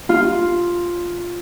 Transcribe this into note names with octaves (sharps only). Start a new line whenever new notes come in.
F4